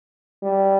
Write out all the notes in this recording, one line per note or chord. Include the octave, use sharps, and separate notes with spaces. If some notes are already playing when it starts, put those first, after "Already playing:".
G3